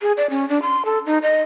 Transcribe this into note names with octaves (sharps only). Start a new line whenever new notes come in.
G#4
D5
C#4
D4
C6
A4
D#4
D#5